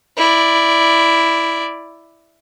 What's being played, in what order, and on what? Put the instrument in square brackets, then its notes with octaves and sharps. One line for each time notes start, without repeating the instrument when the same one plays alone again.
[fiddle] E4 D5